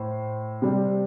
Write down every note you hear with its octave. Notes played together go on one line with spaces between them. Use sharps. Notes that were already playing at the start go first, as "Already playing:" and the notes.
Already playing: A2 C5
C3 G3